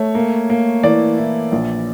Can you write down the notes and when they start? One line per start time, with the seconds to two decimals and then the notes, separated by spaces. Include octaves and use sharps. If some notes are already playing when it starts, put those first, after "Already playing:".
Already playing: A3 C#5
0.15 A#3
0.50 A#3
0.83 E3 D5
1.18 E4
1.52 A#1